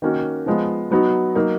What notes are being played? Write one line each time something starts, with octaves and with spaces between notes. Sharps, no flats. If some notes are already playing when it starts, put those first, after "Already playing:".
D#3 A#3 C#4 F#4
F3 G#3 B3
F#3 B3 D#4 F#4
F#3 A#3 D#4